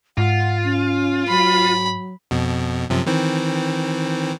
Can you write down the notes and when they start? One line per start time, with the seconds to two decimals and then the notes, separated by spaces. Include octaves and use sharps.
0.18 G#2 F4 F#5
0.64 C#4
1.29 F#3 B5
2.31 F2 B2
2.90 F#2 C3 F3
3.06 D#3 E3 C4